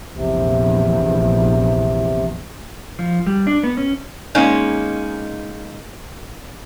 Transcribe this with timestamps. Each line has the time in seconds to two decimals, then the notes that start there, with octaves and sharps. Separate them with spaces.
0.14 A#1 E2 C3
2.99 F3
3.26 G3
3.47 D4
3.64 B3
3.77 C#4
4.35 G#3 A#3 C#4 D#4